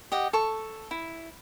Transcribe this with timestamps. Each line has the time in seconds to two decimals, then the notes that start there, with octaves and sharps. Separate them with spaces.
0.12 G4 D#5 F#5
0.33 A4 C#6
0.91 E4